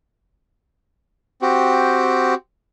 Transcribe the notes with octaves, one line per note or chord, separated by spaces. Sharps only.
C4 F#4 G4